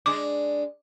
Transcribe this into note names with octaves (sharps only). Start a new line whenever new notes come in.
G#3 D4 D6